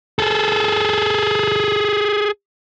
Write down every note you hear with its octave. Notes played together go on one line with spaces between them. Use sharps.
G#4 A4